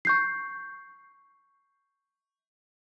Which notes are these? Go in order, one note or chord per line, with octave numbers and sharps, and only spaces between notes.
C#6 G6 C7